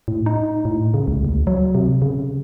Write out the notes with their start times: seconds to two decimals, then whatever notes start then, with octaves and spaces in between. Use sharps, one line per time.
0.08 A2
0.26 D#4
0.65 A2
0.94 C#3
1.08 C#2
1.25 D2
1.47 F#3
1.75 C3
2.02 C#3